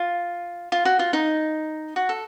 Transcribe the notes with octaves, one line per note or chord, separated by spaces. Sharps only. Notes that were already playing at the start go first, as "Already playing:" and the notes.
Already playing: F4
F4
F#4
F4
D#4
F#4
A4